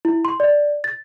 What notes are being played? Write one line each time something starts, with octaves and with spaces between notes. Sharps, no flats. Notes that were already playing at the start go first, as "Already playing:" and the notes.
E4
C6
D5
A6